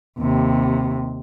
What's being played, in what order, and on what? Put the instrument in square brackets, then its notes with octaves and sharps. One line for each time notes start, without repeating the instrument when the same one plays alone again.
[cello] D#2 C3